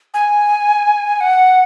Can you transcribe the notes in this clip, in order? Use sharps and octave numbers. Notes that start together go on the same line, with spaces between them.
G#5
F#5